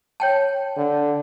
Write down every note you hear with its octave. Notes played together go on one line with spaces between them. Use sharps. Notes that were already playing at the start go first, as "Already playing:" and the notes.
C#5 G5 A5
D3